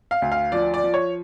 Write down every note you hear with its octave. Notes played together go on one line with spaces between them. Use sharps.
F5
D2
F5
F3 D5
D5
F3
C#5